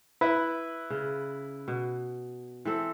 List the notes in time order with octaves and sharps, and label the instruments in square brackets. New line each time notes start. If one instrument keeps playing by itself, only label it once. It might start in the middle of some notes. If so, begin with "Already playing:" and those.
[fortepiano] E4 B4 E5
[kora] C#3
B2
E3 C4 A4